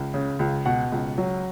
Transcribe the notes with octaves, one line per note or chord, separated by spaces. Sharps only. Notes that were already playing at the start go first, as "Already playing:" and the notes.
Already playing: C#2
C#3
C#2
B2 F#5
C#2
F#3